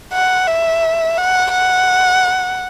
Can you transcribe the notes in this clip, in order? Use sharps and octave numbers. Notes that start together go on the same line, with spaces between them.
F#5
E5
F#5
F#5